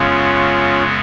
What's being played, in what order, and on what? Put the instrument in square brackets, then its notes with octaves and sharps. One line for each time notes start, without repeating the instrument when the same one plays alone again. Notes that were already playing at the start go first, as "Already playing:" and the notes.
Already playing: [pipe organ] F#2 C#3 G#3 B3 [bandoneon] C#4 F4